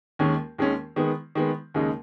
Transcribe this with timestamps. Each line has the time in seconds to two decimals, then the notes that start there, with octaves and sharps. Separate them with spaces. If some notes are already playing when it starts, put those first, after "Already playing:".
0.19 D#2 D#3 G#3 C#4
0.59 D#2 D#3 G#3 C#4
0.96 D#3 G#3 B3
1.35 D#3 G#3 B3
1.74 D#2 C#3 G#3 D#4